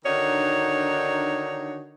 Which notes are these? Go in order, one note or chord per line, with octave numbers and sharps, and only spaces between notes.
D3 D#3 D4 D#4 F#4 C#5